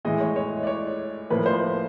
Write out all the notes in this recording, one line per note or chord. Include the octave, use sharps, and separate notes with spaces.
A2 E3 G#3 D#5
C#5
C#5
D5
C#5
A2 F3 A#3 B4
C5